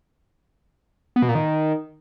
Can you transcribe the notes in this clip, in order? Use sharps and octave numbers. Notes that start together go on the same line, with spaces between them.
B3
B2
A#2
D#3